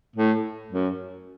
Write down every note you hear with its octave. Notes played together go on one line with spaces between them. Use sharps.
A2
F#2